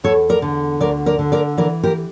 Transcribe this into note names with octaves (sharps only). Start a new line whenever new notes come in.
E2 A4 C#5
A#4 D5
D3
D2 A#4 D5
A#4 D5
D3
A#4 D5
E3 A#4 D5
G4 A#4